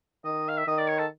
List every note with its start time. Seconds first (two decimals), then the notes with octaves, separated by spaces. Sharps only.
0.25 D#3 D#5
0.49 F5
0.58 E5
0.67 D#3 D#5
0.78 D5
0.88 C#5
0.98 A4